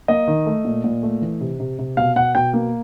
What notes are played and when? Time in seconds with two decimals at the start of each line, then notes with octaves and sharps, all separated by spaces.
0.08 A#3 D#5
0.27 D#3
0.46 A3
0.65 A#2
0.84 A#2
1.03 A3
1.22 E3
1.41 C3
1.60 C3
1.79 C3
1.97 B2 F5
2.16 B2 F#5
2.35 B2 G5
2.53 A#3